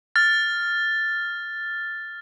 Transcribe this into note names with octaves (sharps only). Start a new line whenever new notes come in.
F6 A6